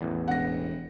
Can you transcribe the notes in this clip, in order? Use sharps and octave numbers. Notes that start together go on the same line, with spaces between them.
A1 E2
E1 F#5 A#6